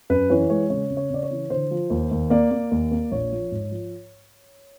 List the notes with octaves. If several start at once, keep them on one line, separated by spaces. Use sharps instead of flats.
F#2 B4
E3 C#5
G#3 C#5
C#3 C#5
C#3
C#5
C#3 D5
C#5
E3
D3 C5
F3
D#2
D#2
A#3 D5
A#3
D#2
A#3
A#1 C#5
F3
G#2
F3